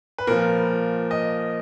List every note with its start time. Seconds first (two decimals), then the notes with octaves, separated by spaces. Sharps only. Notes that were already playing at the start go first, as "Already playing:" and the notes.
0.18 B4
0.27 A#2 F3 A#4
1.11 D#5